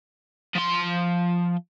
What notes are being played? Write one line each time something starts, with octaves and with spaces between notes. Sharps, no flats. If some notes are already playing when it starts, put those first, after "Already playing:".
F3 C6